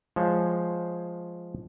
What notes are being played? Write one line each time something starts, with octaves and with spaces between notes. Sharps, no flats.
F3 G#3 C5 C#5